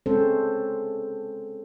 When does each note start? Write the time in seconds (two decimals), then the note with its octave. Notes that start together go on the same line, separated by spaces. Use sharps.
0.06 G#3 C4 C#4 A4 C5